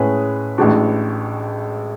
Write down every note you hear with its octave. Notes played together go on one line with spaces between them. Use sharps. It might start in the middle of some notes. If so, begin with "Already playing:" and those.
Already playing: A2 G#3 C#4 G#4 B4
A1 A2 G#3 D4 F#4